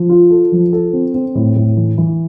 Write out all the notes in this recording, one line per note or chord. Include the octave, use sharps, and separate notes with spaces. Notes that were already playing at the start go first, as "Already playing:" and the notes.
Already playing: F3
F4
A4
F3
A4
C4
C4
A2
A2
E3
E3